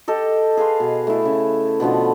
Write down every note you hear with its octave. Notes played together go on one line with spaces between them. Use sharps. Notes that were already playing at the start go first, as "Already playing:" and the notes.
G4 A4 D#5
G#4 B4 F5 C6
B2
A3 E4
C#3
B2 D3 F3 B3